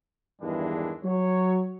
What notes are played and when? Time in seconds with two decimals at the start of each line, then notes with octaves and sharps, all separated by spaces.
0.41 E2 G2 D#3 E3 G#3 D4
1.04 F#3 C#5